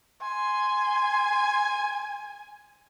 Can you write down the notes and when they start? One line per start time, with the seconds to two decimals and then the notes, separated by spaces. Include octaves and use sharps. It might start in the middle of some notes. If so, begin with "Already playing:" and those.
0.22 G#5 C6